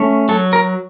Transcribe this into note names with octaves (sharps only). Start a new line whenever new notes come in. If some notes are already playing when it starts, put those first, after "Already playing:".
Already playing: A3 C#4
F#3 A4
A#4